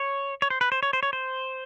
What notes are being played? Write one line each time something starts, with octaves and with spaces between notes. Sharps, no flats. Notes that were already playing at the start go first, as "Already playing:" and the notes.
Already playing: C#5
C#5
C5
B4
C5
C#5
C5
C#5
C5